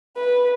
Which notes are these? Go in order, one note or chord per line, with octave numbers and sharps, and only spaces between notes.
B4